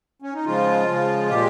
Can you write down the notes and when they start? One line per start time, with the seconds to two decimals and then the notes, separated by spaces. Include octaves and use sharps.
0.22 C#4
0.34 D#4
0.45 C#3 F3 G#3 F4
0.87 C#3 F3 G#3
1.30 A#2 G#3 G4